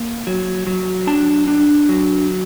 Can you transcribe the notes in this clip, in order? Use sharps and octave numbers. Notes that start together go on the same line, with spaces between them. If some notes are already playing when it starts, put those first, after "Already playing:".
Already playing: A#3
F#3
F#3
D4 A5
D4
F#3